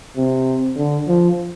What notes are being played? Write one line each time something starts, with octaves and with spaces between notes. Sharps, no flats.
C3
D3
F3